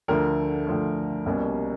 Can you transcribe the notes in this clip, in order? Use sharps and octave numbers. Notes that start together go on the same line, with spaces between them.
D2 D3 F3 A3 A#4
D2 D3 F3 A3
C2 B2 G3 A#3 C#4